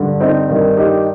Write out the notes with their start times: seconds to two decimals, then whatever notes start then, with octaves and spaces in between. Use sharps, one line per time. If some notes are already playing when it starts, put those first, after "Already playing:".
Already playing: G2 D3
0.20 C4 D#4
0.49 G2 D#3
0.77 D#4 G4